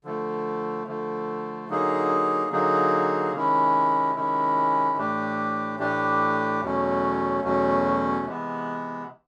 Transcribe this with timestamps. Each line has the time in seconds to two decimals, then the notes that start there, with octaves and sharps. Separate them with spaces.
0.04 D3 F3 A3
0.87 D3 F3 A3
1.69 D3 F#3 A#3 D#4 G#4
2.51 D3 F#3 A#3 D#4 G#4
3.33 C3 D#3 G#3 C#4 E4
4.15 C3 D#3 G#3 C#4 E4
4.97 A2 E3 A3 D4 G4
5.79 A2 E3 A3 D4 G4
6.61 E2 B2 F#3 A3 C#4
7.43 E2 B2 F#3 A3 C#4
8.25 C3 E3 G#3 B3